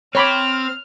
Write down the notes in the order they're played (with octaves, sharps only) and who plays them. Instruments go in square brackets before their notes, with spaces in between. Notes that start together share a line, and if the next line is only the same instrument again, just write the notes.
[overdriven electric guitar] C4 [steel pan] C#5 B5 D6 [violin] F6